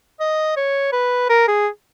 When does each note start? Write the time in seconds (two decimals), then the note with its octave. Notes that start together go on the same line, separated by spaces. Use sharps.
0.20 D#5
0.57 C#5
0.93 B4
1.30 A#4
1.48 G#4